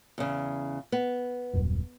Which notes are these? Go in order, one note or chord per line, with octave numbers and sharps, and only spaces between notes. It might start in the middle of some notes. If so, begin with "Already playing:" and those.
E2 C#3
B3
D#1 F#2